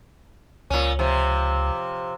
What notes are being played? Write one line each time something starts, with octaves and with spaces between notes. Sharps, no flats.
C#2 A#2 C#4
C3 F3